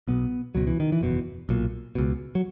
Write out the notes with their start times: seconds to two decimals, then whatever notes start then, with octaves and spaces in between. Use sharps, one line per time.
0.08 B1 B2 B3
0.55 C#2 B2 F#3
0.67 E3
0.80 D#3
0.92 E3
1.01 F#1 E2 B2
1.49 B1 A#2
1.95 C#2 B2
2.35 F#3